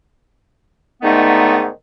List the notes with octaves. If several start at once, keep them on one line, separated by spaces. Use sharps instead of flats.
G#2 D3 D#3 A3 B3 D#4